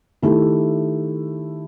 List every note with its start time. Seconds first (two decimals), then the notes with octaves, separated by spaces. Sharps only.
0.22 D#3 A3 E4 G4